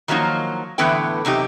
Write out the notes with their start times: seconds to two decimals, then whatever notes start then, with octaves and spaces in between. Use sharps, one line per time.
0.08 D#3 F3 F#3 A#3 D#4
0.78 A2 D3 E3 B3 B4 G5
1.25 F#2 C3 D#4 G4